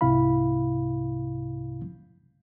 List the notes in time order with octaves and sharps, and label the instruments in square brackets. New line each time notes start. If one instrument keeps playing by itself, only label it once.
[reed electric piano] C2 G#2 C3 E4 F5 B5